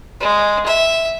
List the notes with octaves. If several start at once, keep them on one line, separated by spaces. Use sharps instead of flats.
G#3
E5